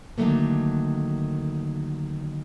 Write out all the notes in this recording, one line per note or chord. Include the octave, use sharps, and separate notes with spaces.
D3 D#3 F#3 A3 A#3